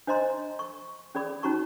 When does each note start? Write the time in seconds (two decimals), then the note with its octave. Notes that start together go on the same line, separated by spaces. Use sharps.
0.07 D4 C5 D#5 A#5 C6
0.59 C#6
1.15 C#4 G#4 D5 B5 D6
1.43 C#4 D#4 F#4 A#5 C#6